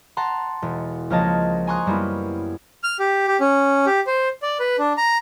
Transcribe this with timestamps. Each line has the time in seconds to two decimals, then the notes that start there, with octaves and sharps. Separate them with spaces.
0.17 F#5 A5 A#5 C6
0.62 E1
1.10 C#2 F3 A#3 C#5 D#5 A5
1.67 G#5 A#5 C6 C#6 D#6 F#6
1.86 F#2 G3 A#3 B3 E4
2.83 F6
3.00 G4
3.28 G4
3.40 C#4
3.86 G4
4.07 C5
4.43 D5
4.60 B4
4.78 D4
4.98 A#5